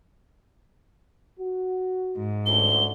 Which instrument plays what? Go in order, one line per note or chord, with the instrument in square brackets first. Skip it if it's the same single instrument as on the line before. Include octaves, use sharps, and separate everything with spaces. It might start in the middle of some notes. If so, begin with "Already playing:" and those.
[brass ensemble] F#4
[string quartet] G#2
[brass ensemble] A1 D2 [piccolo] G7